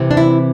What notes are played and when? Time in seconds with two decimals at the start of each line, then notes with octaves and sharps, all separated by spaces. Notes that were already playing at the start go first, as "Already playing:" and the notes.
Already playing: C3 E3 C4
0.11 D4
0.17 E4